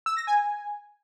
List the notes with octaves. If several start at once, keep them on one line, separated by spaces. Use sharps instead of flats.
E6
A#6
G#5